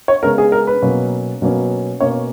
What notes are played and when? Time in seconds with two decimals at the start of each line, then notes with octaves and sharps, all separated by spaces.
0.08 C#5
0.23 C#3 G#3 B3 A#4
0.38 G#4
0.52 A#4
0.67 B4
0.82 B2 F#3 A#3 C#4
1.42 B2 F#3 A#3 C#4
2.00 B2 A#3 C#4 C#5